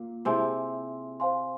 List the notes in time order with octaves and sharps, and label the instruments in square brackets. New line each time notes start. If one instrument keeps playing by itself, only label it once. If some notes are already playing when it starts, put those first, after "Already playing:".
Already playing: [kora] A#2 A#3
[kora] C3 C4 [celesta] E4 G#4 E5 G#5 C6
[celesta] C5 F5 G#5 C6